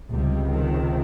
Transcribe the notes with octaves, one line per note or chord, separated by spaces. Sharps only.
C#2 C3 G3
D#3